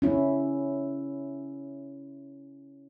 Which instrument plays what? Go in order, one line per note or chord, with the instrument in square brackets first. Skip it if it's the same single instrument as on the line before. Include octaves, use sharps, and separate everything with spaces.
[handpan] C#4 E4